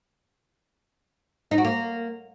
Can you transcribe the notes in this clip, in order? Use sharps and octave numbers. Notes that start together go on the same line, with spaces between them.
D#4
F#4
A#3